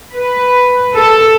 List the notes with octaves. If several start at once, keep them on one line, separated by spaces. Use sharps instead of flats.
B4
A4